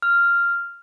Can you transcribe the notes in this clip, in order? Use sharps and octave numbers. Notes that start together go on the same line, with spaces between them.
F6